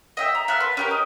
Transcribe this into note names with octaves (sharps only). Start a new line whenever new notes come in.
D#5 E5 G5
A#5
E5 F#5 A5 F6
B4 C5
C#4 G4 A#4
D#5